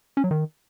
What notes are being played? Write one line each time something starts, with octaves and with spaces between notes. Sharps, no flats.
C#4
F#3
D#3